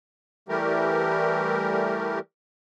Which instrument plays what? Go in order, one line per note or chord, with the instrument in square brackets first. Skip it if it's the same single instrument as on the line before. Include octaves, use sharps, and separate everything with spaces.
[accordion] E3 G3 A3 G4 A#4